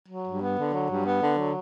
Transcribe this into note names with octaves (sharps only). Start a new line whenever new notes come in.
F#3
G2
B3
D3
F#3
G2
B3
D3
F#3